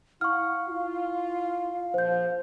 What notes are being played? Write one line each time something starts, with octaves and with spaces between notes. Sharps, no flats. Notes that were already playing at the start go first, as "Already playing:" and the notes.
E4 F5 F#5 C#6 F6
E4 F4
A#1 F3 C5 G6